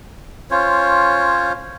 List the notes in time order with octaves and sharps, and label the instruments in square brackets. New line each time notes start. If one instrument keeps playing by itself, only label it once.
[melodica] C#4 F4 C5 C#5